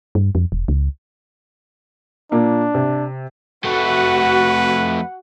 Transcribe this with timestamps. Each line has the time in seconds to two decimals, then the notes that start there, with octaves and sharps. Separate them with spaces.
0.15 G2
0.35 F2
0.52 E1
0.68 C#2
2.32 A#2 A#3 D4
2.74 C3
3.65 F2 A3 F#4 B4 F#5